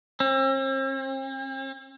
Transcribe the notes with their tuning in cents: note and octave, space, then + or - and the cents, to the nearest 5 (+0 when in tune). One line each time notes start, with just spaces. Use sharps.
C4 +45